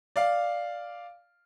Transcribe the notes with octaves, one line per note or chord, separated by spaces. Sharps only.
D5 F5